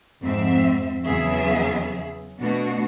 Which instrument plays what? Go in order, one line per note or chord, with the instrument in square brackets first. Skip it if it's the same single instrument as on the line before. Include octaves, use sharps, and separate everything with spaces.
[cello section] F2 G#2 G#3 C4 E5
E2 C#3 F#3 B3 G#4 E5
B2 A3 B3 D4 F#4